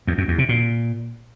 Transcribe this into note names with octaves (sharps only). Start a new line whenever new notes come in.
E2
F#2
E2
C3
A#2